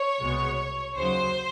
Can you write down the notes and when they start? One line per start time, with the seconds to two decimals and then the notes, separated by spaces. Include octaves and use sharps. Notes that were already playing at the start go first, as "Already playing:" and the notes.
Already playing: C#5
0.19 C2 B2 G#3 B3
0.96 D#2 C#3 F#3 C5